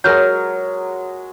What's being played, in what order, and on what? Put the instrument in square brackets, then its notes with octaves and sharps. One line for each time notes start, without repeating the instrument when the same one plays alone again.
[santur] F#3 G#3 [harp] A#4 F6 G6